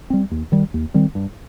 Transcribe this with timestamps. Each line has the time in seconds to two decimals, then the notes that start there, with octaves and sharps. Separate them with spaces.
0.10 G3 C4
0.31 D#2
0.52 D#3 G3
0.74 D#2
0.94 D#3 G3 C4
1.15 G2